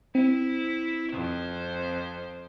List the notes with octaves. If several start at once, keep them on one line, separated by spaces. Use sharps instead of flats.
C4 E4
F2 C5